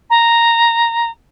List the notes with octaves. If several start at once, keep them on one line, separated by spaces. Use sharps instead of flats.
A#5